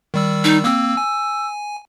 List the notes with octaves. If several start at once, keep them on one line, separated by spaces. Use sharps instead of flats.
D#3 G3 E6
D#4
A#3 C4 E6
G#5